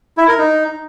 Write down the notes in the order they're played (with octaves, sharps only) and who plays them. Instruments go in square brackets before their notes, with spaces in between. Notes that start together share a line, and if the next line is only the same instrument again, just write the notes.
[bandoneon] E4
A#4
D#4